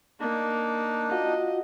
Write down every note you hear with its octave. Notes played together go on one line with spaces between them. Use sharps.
A#3 D4 D#4
F4 F#4 D#5